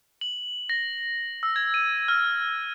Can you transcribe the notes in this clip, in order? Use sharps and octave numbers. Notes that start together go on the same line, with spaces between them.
F#7
A#6
E6
G#6
D#7
F6